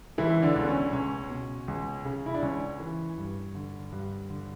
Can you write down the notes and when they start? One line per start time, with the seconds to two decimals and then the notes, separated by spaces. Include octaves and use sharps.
0.18 C#2 E3 E4
0.42 D3 D4
0.56 C#2
0.63 B3
0.68 C#4
0.93 C#2 C#4
1.30 B2
1.68 C#2
2.05 C#3
2.26 E4
2.34 D4
2.42 C#2 C#4
2.80 E3
3.18 G2
3.55 D3
3.92 G2
4.30 D3